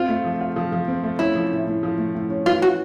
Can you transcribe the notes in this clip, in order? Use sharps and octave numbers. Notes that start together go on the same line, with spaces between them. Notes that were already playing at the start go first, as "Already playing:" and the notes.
Already playing: C4 F4
A3
F3
F4
F3
F3
C4
A3
C#4 E4
F3
A2
A2
F3
A3
A2
C#4
E3 F4
E3 F#4